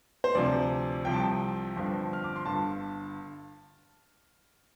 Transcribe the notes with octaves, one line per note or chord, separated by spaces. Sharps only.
C5
D2 C3 F3 D5
C2 C3 F3 G5
A5
G5
G1 F2 D3 F3
F6
D6
C6
G1 G2 D3 A5